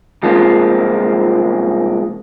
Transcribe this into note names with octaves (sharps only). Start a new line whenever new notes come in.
C2 F3 G#3 A#3 C4 F4